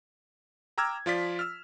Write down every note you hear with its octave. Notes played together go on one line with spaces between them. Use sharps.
G5 A#5 D6 E6 F6 G#6
F3 F4 D5 B6
E6 F6